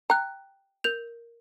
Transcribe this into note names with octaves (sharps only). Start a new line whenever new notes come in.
G5 A#5 F#6
A#4 G6 F7